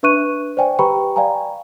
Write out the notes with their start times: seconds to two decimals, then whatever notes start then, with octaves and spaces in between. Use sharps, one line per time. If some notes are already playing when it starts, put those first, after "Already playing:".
0.03 D4 B4 E5 C#6 F#6 D#7
0.57 C5 D5 G5 G#5
0.79 G4 B4 G5 A#5 B5 C#6
1.16 D5 F5 G5 G#5 A#5